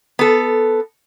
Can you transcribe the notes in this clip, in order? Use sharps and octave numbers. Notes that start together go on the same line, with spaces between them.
B3 A4